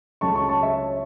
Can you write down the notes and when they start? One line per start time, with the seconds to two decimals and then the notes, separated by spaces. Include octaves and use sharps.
0.21 C#2 C#3 F#3 A3 C#4 A5 C#6
0.35 A5 C#6
0.49 A5 C#6
0.62 C#5 E5